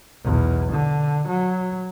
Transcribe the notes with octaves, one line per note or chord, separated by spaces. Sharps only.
B1 E2
D3
F#3